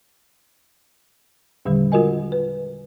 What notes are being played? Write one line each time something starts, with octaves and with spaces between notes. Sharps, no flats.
E2 A#2 D3 D#3 G3
G#3 F4 F#4 A#4 D#5 G#5
B4